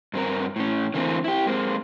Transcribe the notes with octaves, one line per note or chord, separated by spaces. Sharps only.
G2 C4 A#4
A2 C#4
D3 E3 A3 A#3 C4
E4 G4
G#3 A#3 C4